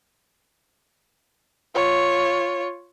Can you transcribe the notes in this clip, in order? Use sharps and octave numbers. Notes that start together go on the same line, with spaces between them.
F4 C#5